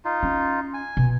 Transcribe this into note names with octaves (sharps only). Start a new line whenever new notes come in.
D#4 F4
C#4
G#5
B2